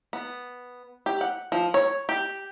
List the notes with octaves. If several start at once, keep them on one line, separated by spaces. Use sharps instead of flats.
B3
G4
F#5
F3
C#5
G4